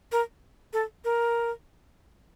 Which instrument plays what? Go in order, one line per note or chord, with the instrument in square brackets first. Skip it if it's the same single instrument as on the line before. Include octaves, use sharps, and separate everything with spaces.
[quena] A#4
A4
A#4